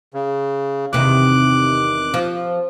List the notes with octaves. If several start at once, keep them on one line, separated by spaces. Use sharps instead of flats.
C#3
E2 C3 D#3 D6 F#6
F3